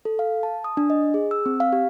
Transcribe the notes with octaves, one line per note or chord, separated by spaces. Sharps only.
A4
F5
A5
D#6
D4
D#5
G#4
E6
C4
F5
G4